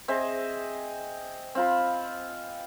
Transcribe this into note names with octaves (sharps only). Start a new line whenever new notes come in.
C4 G#4 D#5 E5
C4 F4 B5